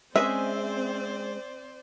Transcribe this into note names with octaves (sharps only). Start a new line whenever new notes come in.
G#3 C4 C#4 G#4 C5 D5 E5